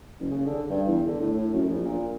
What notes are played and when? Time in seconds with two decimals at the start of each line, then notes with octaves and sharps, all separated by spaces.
0.19 F#1
0.31 C#3
0.46 D3
0.69 G2
0.87 E2
1.07 D3
1.20 A2
1.38 A2
1.53 F#2
1.67 A#1
1.84 A#2